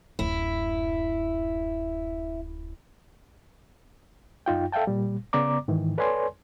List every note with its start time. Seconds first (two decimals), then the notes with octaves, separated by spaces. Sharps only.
0.19 D1 F#2 E4
4.46 F#2 D#4 F4 G5
4.72 A4 E5 F5 G5 A5
4.87 A#2 G3
5.33 C#3 B3 D5 A#5 D6
5.68 G#2 D#3 E3
5.98 A4 B4 C#5 D5 G#5 C6